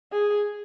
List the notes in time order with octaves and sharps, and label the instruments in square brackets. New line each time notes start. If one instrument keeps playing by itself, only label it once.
[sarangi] G#4